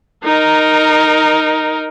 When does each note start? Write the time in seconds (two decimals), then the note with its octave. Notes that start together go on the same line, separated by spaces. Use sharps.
0.24 D#4 A#4